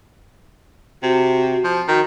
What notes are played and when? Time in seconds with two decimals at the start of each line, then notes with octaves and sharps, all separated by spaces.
1.03 C3 F#4
1.64 F3
1.88 D#3 F#4